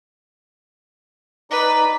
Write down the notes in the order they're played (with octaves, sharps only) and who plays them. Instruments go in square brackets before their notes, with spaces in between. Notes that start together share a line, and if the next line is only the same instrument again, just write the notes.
[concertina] D#4 D5 [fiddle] B4